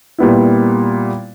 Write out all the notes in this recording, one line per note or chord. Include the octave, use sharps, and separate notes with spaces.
A#2 G3 B3 E4